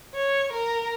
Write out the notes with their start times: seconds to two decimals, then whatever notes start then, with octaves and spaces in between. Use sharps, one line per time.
0.15 C#5
0.53 A#4